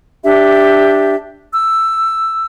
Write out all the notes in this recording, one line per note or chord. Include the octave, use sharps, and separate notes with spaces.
D4 G4 E5
E6